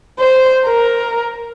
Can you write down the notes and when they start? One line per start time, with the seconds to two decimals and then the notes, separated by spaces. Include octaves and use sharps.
0.19 C5
0.66 A#4